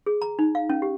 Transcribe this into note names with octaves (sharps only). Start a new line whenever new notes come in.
G#4
A#5
D#4
F5
C#4
G4